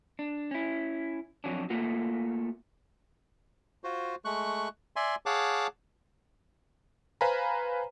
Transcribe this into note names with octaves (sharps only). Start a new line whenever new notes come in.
D4
C#4 E4
F2 F#3 C#4 D4
A3 A#3 F4 F#4
F4 F#4 C5
G#3 A3 C#6 F#6
D5 E5 G#5 C6
G#4 C#5 F5 F#5 A5 D6
B4 C5 F5 G#5 A#5 B5